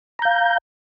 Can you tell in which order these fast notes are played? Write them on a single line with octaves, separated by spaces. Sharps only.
A#5 G6 F5